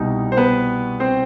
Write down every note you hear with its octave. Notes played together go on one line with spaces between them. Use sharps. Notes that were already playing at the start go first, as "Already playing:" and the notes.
Already playing: C2 B2 G3 D#4
C5
B3 B4
C4 C5